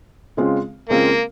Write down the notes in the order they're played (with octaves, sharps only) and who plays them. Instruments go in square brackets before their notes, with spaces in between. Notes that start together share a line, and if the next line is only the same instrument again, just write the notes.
[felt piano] C#3 G#3 C4 F4
[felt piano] C#3 G#3 C4 F4 [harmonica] A#3